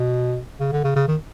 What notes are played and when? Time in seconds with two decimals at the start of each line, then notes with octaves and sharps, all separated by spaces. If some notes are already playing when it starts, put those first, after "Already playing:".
Already playing: B2
0.60 C#3
0.72 D3
0.84 C#3
0.96 C#3
1.08 D#3